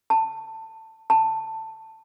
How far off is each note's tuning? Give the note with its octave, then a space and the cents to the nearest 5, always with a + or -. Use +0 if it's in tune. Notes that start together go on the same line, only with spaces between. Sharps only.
A5 +20
A5 +15